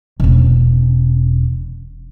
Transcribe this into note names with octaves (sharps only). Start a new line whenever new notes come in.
E1 C#4